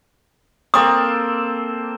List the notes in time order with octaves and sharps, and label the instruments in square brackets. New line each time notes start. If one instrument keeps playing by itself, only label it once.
[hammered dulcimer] A#3 C4 A4 [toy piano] D#6